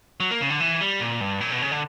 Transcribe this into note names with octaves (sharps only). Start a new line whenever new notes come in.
F#3
A#3
C#3
D3
E3
G3
A#2
G2
A#2
B2
C#3
D3